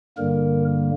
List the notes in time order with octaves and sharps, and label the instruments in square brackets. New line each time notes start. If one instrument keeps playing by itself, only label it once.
[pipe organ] G2 D3 G3 A#3 A#4